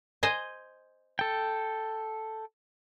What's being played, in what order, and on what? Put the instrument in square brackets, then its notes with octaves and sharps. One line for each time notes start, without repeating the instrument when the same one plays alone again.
[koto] C5 D#5 G#5
[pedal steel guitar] A4 G5